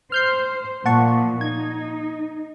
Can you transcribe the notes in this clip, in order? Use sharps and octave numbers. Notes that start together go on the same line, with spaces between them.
C5 F6 G6 C7
A#2 F3 A#3 F#5 A5 C#6
D#4 G#6